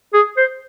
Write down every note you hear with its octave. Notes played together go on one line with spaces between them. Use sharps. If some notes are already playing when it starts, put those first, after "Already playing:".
G#4
C5